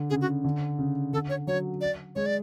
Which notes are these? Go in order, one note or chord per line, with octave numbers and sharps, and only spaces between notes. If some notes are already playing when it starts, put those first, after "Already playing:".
Already playing: D3
C#3 G#4
F#4
D3
C#3
D3 A4
C#5
F#3 C#5
D5
G#3 C#5
D5